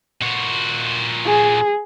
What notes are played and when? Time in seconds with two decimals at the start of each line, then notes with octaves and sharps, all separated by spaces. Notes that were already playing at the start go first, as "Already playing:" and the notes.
0.22 A#2 F#4
1.26 G#4